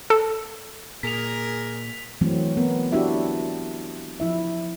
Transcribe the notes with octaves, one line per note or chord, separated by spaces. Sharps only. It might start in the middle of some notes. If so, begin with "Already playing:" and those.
A4
A#2 G#4 A#4 B6 F7
E3 F#3 A3 C4
B3 A#4
D4 E4 F#4 G4 E5
F3 E4 E5